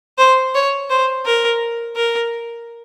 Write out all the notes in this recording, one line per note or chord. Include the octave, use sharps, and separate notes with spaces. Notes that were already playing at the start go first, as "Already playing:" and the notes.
C5
C#5
C5
A#4
A#4